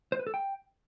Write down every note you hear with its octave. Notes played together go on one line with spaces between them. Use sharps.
C5
B4
A4
G5